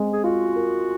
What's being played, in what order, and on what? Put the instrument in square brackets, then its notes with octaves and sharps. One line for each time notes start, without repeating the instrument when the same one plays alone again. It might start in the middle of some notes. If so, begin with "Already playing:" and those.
Already playing: [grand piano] G#3 C4
[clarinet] G#4
[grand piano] F4 [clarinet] F#4
[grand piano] A#4